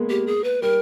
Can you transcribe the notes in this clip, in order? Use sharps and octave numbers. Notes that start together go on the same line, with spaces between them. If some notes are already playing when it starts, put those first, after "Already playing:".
Already playing: G#3 A#3 B3
G4
G#4
B4
G3 A#4